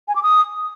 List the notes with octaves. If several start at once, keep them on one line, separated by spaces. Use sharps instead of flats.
G#5
D6
D#6